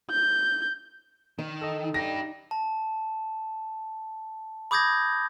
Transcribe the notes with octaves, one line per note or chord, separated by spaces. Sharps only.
G6
D#3 D#4
A4 D#5
D4 G4 A#6
A5
B5 D6 D#6 G6 G#6 A#6